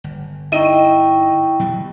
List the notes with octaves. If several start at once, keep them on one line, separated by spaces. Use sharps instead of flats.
G1
D#4 E4 D#5 G5 C#6 D#7
B2 F#3 G3